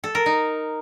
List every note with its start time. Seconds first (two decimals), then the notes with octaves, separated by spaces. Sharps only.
0.04 A4
0.15 A#4
0.26 D#4